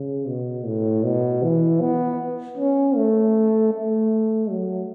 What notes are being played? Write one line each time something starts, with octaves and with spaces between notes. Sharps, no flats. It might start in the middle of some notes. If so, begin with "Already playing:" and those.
Already playing: C#3
B2
A2
B2
E3
B3
C#4
A3
A3
F#3